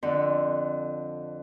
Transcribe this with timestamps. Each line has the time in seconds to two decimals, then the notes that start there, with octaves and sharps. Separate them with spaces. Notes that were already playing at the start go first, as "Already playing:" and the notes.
0.03 F2 D3